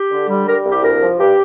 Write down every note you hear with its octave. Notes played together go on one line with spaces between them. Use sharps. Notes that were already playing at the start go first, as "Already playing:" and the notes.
Already playing: G4
D3
G3
G3 A#4
C2
G4
D2 A#4
F3
G2 G4